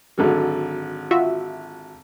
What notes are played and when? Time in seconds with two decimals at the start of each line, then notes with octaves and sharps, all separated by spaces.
0.18 G#1 D3 F#3
1.11 F4 F#4 E5